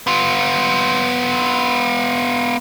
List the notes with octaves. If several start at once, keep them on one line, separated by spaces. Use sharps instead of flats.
B3 F4